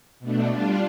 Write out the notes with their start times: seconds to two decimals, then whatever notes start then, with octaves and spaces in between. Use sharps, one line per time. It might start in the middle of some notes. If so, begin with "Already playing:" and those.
0.20 B2 A3 D4
0.50 G3 D4 F4